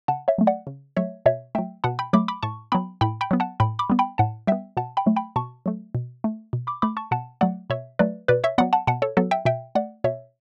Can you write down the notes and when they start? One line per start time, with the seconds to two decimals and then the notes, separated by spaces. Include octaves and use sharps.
0.08 C#3 F#5 A5
0.28 C#5 E5
0.38 F#3 A3
0.47 D5 F#5
0.67 C#3
0.97 F#3 A3 C#5 E5
1.26 B2 C#5 E5
1.55 F#3 A3 E5 G5
1.84 B2 F#5 A5
1.99 G5 B5
2.13 F#3 A3 B5 D6
2.28 B5 D6
2.43 A2 A5 C#6
2.72 F#3 B3 G5 B5
3.01 A2 G5 B5
3.21 G5 B5
3.31 F#3 B3
3.40 F#5 A5
3.60 A2 G5 B5
3.79 B5 D6
3.90 G3 B3
3.99 G5 B5
4.18 A2 F#5 A5
4.47 G3 B3 E5 G5
4.77 B2 F#5 A5
4.97 G5 B5
5.06 F#3 A3
5.16 G5 B5
5.36 B2 A5 C#6
5.66 F#3 A3
5.95 B2
6.24 A3
6.53 B2
6.67 B5 D6
6.82 A3 B5 D6
6.97 A5 C#6
7.11 B2 F#5 A5
7.41 F#3 A3 D5 F#5
7.70 B2 C#5 E5
7.99 F#3 A3 B4 D5
8.28 B2 B4 D5
8.44 C#5 E5
8.58 F#3 B3 D5 F#5
8.73 F#5 A5
8.87 B2 F#5 A5
9.02 A4 C#5
9.17 F#3 B3 F#4 A4
9.31 E5 G5
9.45 B2 E5 G5
9.75 A3 D5 F#5
10.04 B2 C#5 E5